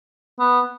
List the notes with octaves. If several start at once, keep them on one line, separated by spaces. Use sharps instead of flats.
B3